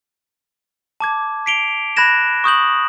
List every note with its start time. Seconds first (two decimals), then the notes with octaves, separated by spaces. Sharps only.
1.00 A5 D6 G#6
1.46 B6 C7 D7 F7 G7
1.97 B5 F#6 G#6 A#6 E7
2.44 C#6 D#6 G6 F#7